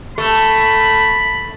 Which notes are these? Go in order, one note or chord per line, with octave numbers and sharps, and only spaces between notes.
A3 B5